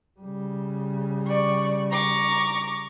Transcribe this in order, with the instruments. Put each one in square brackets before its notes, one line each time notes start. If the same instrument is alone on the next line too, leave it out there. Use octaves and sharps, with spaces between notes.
[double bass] C#3 G3
[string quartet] D5 C#6
A#5 C#6 D6